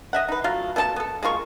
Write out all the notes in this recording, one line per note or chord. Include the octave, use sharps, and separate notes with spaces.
D#5 E5 F#5
D#4 B4
F#3 A3 F4 F5
B2 A3 D#4 A5
B3 A4
G#3 A#3 F4 C#6